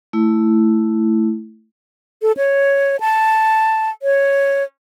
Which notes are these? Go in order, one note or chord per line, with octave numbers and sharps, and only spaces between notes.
A3 E4
A4
C#5
A5
C#5